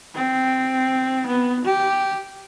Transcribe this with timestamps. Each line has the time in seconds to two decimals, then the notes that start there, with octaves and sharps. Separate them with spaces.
0.15 C4
1.26 B3
1.65 G4